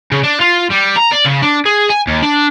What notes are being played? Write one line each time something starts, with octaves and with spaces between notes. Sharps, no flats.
C#3
D4
F4
G3
A#5
D5
C#3
D4
G#4
G#5
D#2
D4